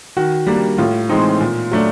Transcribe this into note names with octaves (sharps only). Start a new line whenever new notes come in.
D#3 F#4
G3 A#3 D4
A2 F4
E3 G#3 C4 D#4
A#2
F#3 A3 D4